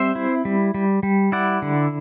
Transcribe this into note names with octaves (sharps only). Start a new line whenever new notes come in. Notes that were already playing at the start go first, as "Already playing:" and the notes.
Already playing: G3 C4 C5 E5
E4
G3
G3
G3
E4 D5 F#5
D3